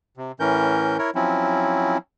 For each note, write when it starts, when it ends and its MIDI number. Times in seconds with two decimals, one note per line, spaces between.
0.17 0.32 48
0.40 0.97 45
0.40 0.97 52
0.40 0.97 61
0.40 0.97 70
0.40 0.97 91
0.98 1.10 64
0.98 1.10 70
0.98 1.10 73
1.15 1.97 53
1.15 1.97 54
1.15 1.97 60
1.15 1.97 61
1.15 1.97 64